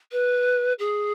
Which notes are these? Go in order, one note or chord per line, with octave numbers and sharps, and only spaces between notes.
B4
G#4